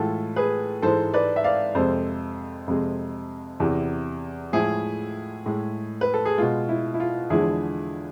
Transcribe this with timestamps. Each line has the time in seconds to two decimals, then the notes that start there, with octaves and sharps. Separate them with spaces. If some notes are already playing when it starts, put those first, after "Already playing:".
Already playing: A2 E3 G#3 F4 A4
0.36 G#4 B4
0.82 G#2 E3 G#3 A4 C5
1.14 B4 D5
1.36 E5
1.44 D5 F5
1.75 F2 C3 G#3 A4 C5
2.68 F2 C3 G#3
3.60 E2 C3 E3
4.53 A2 F3 G#3 E4 G#4
5.46 A2 G#3
6.01 B4
6.14 A4
6.25 G#4
6.38 B2 G#3 F4
6.69 E4
6.94 E4
7.00 F4
7.30 E2 D3 F3 G#3 E4 G#4